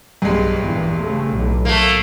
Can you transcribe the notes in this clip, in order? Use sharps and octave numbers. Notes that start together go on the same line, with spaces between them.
B1 G2 G#3
A#1 E2 E3
C#3 A3
B1 A2
A3 A#3